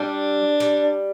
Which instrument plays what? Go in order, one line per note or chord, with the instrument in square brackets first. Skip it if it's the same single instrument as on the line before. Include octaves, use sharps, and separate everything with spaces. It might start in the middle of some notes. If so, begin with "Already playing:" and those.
Already playing: [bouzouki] G3 [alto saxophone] D4
[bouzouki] G3